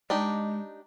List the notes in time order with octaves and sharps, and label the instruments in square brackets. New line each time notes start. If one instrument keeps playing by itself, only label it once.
[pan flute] G#3 [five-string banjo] D4 D#4 G4